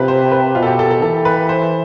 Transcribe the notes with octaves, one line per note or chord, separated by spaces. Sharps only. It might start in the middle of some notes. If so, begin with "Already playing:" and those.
Already playing: C3 F4 G4 B4
C5
B4
B2 F4
A4
G4
A4
A4
E3 A4
B4
C5